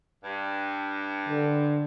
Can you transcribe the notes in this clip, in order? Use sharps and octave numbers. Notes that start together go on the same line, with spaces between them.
G2
D3